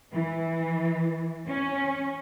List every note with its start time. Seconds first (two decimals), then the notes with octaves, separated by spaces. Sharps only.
0.13 E3
1.48 C#4